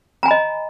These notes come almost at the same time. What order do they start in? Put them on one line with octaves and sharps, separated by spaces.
A#5 G#5 B5 D#5